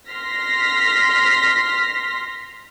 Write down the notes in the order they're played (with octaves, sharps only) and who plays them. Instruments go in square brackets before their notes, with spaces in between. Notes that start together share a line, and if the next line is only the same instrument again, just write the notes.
[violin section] C6 F6 A#6 B6